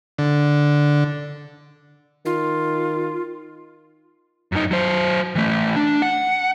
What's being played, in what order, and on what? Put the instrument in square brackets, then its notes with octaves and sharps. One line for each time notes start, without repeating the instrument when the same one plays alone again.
[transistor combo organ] D3
[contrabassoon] D#3 [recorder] F4
[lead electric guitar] F#2 D#4
F#3 C5
E3 A3
D4
F#5